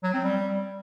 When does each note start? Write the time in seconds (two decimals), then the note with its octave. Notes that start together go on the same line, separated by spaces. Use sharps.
0.03 F#3
0.14 C4
0.24 G3